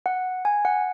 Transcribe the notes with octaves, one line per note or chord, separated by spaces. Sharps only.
F#5
G#5
F#5